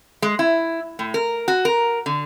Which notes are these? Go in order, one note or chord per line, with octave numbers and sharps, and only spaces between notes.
G#3
E4
A2
A#4
F#4
A#4
D3